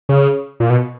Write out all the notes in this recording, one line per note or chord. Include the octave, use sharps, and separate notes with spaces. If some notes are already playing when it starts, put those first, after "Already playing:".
C#3
A#2
B2